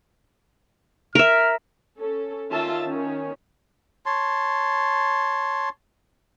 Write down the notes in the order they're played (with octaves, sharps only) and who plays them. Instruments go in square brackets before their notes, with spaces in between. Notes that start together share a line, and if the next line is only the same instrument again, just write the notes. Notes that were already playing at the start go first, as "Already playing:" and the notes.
[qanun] A#4 E5 [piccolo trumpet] F6
[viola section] C#4 A4
D#3 C#4 F4 E5 A5
D#3 C#4
[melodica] C#5 A5 C6